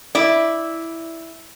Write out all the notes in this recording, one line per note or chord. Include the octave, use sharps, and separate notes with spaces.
E4 D5